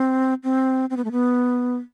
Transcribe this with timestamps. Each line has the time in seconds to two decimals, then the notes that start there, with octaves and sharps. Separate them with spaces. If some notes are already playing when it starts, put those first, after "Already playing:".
Already playing: C4
0.44 C4
0.90 C4
0.97 B3
1.05 A3
1.12 B3